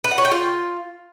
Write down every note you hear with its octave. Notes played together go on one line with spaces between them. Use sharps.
B4
F#5
C#5
G5
F4